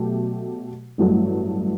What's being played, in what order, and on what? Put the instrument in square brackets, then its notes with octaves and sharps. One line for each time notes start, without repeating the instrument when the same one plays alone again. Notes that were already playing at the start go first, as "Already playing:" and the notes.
Already playing: [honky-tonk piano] B2 F#3 A3 G4
A1 G2 F#3 A3